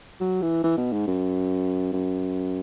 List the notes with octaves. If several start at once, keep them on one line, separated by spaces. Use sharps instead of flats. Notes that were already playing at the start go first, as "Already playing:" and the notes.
F#3
E3
E3
B2
G#2
F#2
F#2